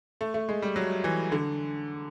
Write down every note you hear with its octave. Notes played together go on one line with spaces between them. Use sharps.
A3
A3
G#3
G3
F#3
E3
D3